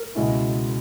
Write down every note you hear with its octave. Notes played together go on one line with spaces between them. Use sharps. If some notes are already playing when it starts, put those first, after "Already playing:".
Already playing: A#4
C#2 B2 G#3 C#4 E4